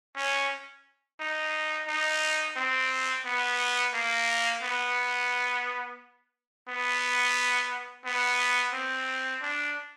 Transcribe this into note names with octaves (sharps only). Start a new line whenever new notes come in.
C#4
D#4
D#4
C4
B3
A#3
B3
B3
B3
C4
D4